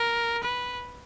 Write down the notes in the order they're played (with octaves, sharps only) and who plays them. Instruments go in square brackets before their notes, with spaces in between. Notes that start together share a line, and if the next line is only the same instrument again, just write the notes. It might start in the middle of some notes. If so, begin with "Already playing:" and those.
Already playing: [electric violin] A#4
B4